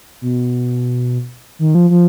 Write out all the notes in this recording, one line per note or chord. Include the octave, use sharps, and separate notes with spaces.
B2
D#3
F3
F3